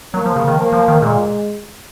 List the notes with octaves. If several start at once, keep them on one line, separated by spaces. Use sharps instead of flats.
F#3 A#3
F3
C#3
D#3
F3 A#3
F3
D#3
A#2 G#3